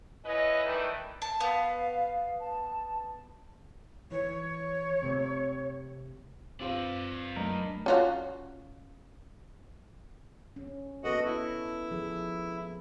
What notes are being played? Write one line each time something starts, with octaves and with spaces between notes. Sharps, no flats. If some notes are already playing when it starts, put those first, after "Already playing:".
C#4 E4 B4 D#5
D#3 E3 G3 A3 D#4 B4
A5
B3 F5
A5
E3 C#5
C3 A3
C4 F4 B4 D5 F5
F#3 A3 D4 D#4 A#4
C#4 F4 F#4
C#4
B3 F#4 A4 B4 D#5 F#5
E4
F3 G#4 A4